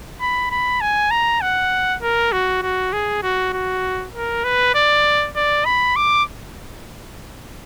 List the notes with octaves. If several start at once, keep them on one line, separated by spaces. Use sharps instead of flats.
B5
B5
G#5
A#5
F#5
A#4
F#4
F#4
G#4
F#4
F#4
A#4
B4
D5
D5
B5
D6